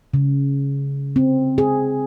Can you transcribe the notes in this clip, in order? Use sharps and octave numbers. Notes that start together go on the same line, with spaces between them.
C#3
C4
G#4